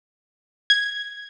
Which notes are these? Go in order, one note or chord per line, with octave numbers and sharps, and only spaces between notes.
G#6